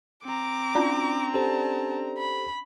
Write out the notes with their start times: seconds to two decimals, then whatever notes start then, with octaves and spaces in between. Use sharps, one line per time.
0.24 C4 A#5 D6
0.75 C#4 D4 D5
1.34 G4 A4 C5 A5
2.18 B5